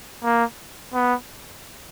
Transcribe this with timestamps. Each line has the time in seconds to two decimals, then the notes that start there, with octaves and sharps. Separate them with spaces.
0.24 A#3
0.93 B3